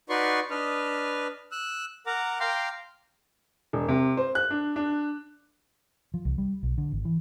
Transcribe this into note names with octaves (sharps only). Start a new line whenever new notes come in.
D#4 F#4 B4 D5 C6 C#6
D4 B4 D#5 F6
E6 F#6
A#4 F#5 A#5 D6
F5 G5 A#5 C6 D6
E1
C3
C5
F#6
D4
D4
F3
C2
G3
B1
D3
G#1
E3